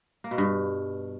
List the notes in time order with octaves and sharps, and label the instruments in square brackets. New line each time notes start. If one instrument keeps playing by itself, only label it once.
[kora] A#3
B2
G2